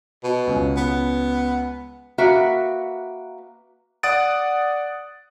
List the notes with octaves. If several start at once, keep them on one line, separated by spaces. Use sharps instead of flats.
B2
C#2
B3
A#3 F#4 B4 E5
D5 F#5 D#6 A6 D7